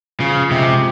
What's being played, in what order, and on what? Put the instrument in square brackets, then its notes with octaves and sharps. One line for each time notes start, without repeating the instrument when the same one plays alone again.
[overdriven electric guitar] C#3 [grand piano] F3
[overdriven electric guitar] C3 [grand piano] G#3 C4